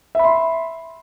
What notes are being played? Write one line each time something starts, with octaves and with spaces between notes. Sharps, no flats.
E5 B5 C6